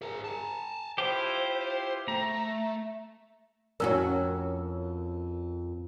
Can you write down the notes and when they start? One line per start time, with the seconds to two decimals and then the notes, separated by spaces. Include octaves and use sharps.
0.02 G#4 A#4
0.24 G#5 A5
0.98 E4 F4 G4 C5
2.08 A3 A#5
3.80 F2 C#4 F#4 A#4 E6